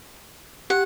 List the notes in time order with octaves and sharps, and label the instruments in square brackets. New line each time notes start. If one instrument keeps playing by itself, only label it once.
[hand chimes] G4 [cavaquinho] F#5